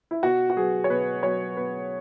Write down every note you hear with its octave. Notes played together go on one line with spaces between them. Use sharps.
E4
B2 F#4
F#4
F#3 B3 G#4
C#5
B2 B4
F#3 B3 C#5
B2 B4